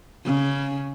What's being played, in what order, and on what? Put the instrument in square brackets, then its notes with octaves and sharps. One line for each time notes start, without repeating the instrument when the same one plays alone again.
[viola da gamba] C#3